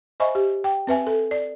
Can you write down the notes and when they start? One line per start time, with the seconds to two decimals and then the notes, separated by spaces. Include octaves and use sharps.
0.20 C5 D#5 E5 G#5 B5 C#6
0.35 G4
0.64 G5
0.87 C4 B4 E5 G#5
1.07 A4
1.31 D5